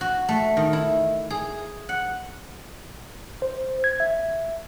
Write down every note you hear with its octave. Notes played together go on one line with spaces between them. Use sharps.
F#4
A3
D#3
E4
G#4
F#5
C5
G#6
E5